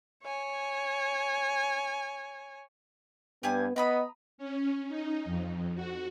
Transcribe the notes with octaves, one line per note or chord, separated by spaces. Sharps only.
C#5 G#5
G2 B3 G4 G#5
B3 D#5 A#5 B5 D#6
C#4
D#4
F2
F#4